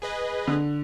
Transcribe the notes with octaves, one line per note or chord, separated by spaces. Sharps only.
G#4 B4 D#5
D3